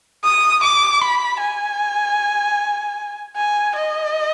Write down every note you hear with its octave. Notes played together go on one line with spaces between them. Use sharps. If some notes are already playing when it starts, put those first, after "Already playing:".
D#6
D6
B5
G#5
G#5
D#5